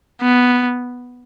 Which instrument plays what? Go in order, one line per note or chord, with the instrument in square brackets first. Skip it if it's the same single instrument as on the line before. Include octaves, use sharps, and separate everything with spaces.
[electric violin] B3